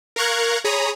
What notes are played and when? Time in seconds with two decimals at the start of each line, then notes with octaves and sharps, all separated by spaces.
0.16 A#4 F5 A#5 C#6 F#6 G#6
0.64 G#4 C#5 A#5 B5 D#6